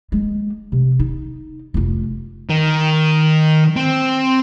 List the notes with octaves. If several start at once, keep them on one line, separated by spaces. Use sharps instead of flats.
G#3 A#3
C3
D#4
F1 F4
D#3
C4